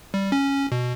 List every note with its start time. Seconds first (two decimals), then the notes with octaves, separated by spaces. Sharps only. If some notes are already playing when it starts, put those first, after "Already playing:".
0.14 G3
0.32 C#4
0.72 B2